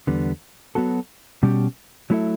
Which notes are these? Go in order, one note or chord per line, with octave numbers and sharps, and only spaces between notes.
E2 D3 G3 B3
F#3 B3 F#4 A4
B2 G3 C#4 G4
F#3 A3 E4 A4 E5